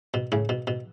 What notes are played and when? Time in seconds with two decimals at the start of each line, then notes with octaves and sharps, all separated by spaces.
0.14 B2
0.32 A2 C#3
0.49 B2
0.67 B2